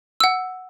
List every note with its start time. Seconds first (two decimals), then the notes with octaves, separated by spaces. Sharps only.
0.20 F#5 E6